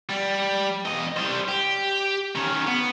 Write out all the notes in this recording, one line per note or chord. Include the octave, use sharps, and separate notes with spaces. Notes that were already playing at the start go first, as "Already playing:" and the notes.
G3
E2 D#5
G3 C5
G4
D#3 C#4
B3